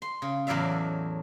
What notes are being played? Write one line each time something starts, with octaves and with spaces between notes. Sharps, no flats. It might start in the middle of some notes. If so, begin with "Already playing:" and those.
C6
C#3
E2 A2 F#3 D5 E5 F5